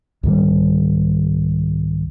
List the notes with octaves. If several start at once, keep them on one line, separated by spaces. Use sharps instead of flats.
C2 G#2 D#3 G3